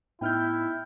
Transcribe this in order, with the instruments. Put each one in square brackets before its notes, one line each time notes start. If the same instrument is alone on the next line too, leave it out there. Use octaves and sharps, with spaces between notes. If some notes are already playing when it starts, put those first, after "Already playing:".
[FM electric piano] A2 B3 D#4 [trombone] E4 [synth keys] G5 F6 G6